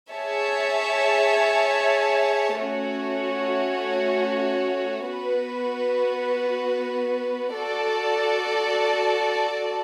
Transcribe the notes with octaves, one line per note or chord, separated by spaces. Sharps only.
G#4 C#5 E5 A5
A3 C#4 F#4 C#5
B3 F#4 B4
F#4 A4 D5 A5